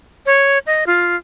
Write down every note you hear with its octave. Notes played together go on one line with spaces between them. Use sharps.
C#5
D#5
F4